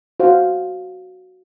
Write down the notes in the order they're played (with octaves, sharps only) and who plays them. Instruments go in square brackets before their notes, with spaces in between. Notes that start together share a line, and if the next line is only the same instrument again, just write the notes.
[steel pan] F#4 C5 F5